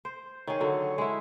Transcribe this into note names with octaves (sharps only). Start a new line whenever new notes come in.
C5
D#3 G#4 C#5
D3 F#3
G#3 E4